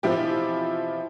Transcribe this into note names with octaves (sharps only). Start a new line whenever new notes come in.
B2 E3 F3 C4 E4 G4